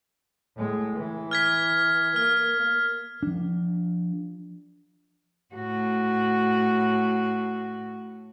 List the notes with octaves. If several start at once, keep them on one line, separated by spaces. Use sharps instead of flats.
A2 G#3
E3
F6 G#6 B6
A#3 F6
F3 D4
A2 F#4